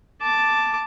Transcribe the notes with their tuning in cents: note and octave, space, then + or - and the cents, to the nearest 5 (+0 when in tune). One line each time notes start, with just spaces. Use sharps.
A5 +0 D6 +0